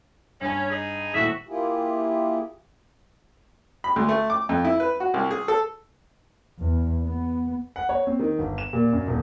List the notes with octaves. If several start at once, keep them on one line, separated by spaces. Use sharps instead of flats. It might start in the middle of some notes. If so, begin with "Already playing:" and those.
G2 C#4 G#5
D#4 G#4
D#1 A2 F#4 E5
A#3 E4 F4 G4 G#4
B5
D2
A3
D6
F2
E4
B4
F#4
C2
G#4
A4
E2
B3
F#5
C#5
C4
D#3
G1
E7
A#2
F#2
D#1